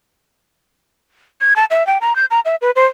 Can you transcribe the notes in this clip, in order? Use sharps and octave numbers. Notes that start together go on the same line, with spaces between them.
G#6
A5
E5
G5
A#5
G6
A#5
E5
B4
C5